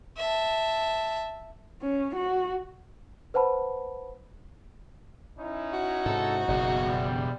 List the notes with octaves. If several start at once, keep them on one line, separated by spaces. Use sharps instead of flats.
E5 A5
C#4
F#4
B4 C5 F#5 A5 B5
C#4 D#4 E4
F#4
G#2 C3 A4
F#1 B2 G#4 E5
G3